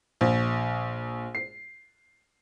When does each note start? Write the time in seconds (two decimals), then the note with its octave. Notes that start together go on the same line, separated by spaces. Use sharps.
0.21 A#1
1.35 C7